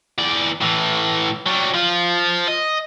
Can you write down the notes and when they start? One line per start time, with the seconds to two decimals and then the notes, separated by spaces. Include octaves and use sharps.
0.19 E3 D5
0.61 A2 E3
1.46 F#3 G3
1.74 F3 F4
2.48 D#5